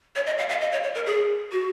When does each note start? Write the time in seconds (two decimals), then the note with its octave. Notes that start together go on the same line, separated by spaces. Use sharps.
0.16 C#5
0.26 D#5
0.38 F5
0.49 F5
0.61 D#5
0.72 C#5
0.83 C#5
0.95 A#4
1.06 G#4
1.52 F#4